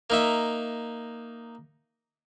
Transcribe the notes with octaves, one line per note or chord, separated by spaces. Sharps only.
A#3 D#4 E5